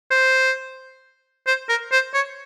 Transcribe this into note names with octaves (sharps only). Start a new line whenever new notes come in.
C5
C5
A#4
C5
C#5